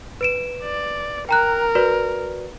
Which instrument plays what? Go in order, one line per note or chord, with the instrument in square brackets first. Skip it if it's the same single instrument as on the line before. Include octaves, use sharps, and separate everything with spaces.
[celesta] B4 D7 E7
[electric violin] D5
[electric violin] A#4 [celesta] G5 A#5 F#6
[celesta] F#4 B4 D5